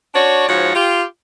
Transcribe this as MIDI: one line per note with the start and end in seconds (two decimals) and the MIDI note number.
0.14 0.47 62
0.14 0.47 66
0.14 0.47 73
0.14 0.47 74
0.48 0.74 44
0.48 0.74 53
0.48 0.74 66
0.48 0.74 73
0.75 1.04 65
0.75 1.04 67